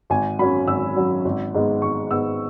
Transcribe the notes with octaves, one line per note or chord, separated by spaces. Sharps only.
G#1 G#5
F#2 F#3 C#4 B5
G#1 E6
F#2 F#3 C#4
G#1
G#2 G#3 B3
G#1 C#6
G#2 G#3 B3 E6